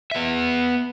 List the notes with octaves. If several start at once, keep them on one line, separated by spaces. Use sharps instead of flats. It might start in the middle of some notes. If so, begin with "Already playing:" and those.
B3 E5